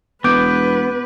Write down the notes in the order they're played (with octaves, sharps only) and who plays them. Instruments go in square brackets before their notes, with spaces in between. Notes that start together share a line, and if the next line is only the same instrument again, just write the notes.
[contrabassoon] E1 [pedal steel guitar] B3 [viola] B4 [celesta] D6 G6 D7